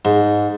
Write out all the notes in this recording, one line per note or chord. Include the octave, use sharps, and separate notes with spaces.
G#2